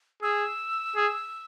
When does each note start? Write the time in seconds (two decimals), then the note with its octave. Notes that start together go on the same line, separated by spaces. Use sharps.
0.22 G#4 E6
0.96 G#4